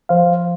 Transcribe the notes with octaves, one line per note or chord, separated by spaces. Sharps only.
F3 C5 F5